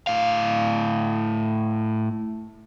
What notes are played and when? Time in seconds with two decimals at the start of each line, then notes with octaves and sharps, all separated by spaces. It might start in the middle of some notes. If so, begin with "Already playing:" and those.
0.07 A2 F5